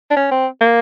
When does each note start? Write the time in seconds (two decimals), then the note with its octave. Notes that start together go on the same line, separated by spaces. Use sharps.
0.10 D4
0.17 C#4
0.31 C4
0.61 A#3